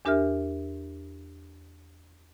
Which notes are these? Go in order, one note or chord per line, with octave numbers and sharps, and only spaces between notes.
E2 D4 G4 A#4 E5 F6